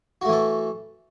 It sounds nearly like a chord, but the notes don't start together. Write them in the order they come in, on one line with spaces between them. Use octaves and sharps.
F#4 A3 E3 A4